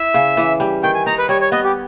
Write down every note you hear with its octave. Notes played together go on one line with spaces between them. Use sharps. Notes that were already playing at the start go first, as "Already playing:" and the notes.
Already playing: E4 E5
C#3
E3
G3
D#3 G5
G#5
D#4 A#5
B4
G3 C#5
C#5
B3 D#5
G4